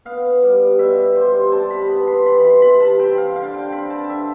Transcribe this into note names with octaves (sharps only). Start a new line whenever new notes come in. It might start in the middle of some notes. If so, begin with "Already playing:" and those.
B3 F5
G3
B2 E5
G3 C5
C5
C3 A5
B5
B3 B5
C6
E3 B5
C6
C3 B5
A5
C4 G5
F5
D3 F5
G5
C4 B5
A5
D3 E5